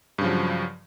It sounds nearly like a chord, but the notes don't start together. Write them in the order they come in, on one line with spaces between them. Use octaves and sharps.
G2 C#3 F3 F#3